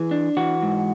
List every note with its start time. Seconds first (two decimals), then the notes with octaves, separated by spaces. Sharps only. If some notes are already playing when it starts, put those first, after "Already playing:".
Already playing: E3 G#4
0.11 D4
0.37 E3 F#4
0.62 G#2